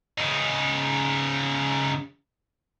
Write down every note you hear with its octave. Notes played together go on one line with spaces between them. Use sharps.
C#3 D#4